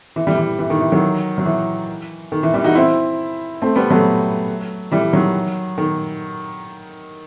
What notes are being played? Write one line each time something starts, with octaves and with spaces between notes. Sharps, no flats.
E3
E3 G3
E3
E3
D#3
E3
D#3 F#3
F#3
E3
D#3
E3
E3 G3
D#4 F#4
C4 E4
A3 C4
G3 B3
F#3 A3
E3 G3
D#3 F#3
D#3